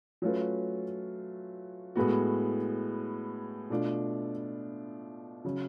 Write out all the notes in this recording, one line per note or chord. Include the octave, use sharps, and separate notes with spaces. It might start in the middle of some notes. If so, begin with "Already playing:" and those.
F#3 A3 C#4 F4 B4
A2 G#3 B3 F#4
B2 A3 D4 F4
C#3 F#3